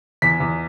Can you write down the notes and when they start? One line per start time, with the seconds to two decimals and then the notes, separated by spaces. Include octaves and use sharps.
0.22 E2 B6
0.40 E2